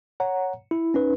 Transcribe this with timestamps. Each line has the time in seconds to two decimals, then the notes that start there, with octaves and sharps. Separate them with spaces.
0.20 C#5 F#5 A#5
0.71 E4
0.94 C#4 D#4 B4